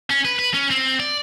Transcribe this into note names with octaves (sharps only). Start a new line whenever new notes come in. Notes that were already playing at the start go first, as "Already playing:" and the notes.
C#4
B4
B4
C#4
C4
D5